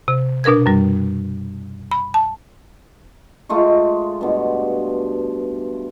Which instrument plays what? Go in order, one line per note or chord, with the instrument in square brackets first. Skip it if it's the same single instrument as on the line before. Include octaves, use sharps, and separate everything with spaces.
[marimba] C3
B2 D4 A#4 B4 G#6
F#2 G3
B5
A5
[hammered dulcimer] G#3 A3 F4 C#6
G2 B2